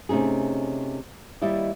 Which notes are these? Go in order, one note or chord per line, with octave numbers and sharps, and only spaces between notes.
C3 A3 C#4 D#4 G#4
D#2 G3 E4 D5 D#5